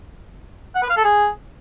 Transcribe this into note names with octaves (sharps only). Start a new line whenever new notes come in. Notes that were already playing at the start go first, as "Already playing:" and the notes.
F#5
B4
F5
A4
G#4